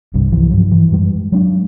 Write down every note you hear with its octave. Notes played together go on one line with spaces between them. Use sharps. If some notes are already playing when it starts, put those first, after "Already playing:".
G1 C2 G2
C2 E3 F3
G2 F3 F#3
E3
F#2 G3 G#3
F#3 G#3 D4